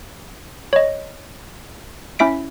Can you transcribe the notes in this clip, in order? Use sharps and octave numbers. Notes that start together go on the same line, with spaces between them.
C#5 D#5
C#4 E4 E5 B6 D7